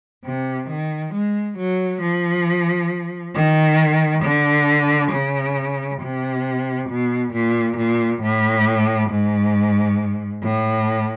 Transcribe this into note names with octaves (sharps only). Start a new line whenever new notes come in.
C3
D#3
G#3
F#3
F3
D#3
D3
C#3
C3
B2
A#2
A#2
A2
G#2
A2